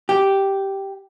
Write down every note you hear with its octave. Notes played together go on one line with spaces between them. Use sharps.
G4